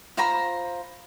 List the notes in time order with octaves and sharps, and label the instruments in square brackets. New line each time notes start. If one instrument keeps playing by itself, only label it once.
[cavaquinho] F4 C5 A#5 B5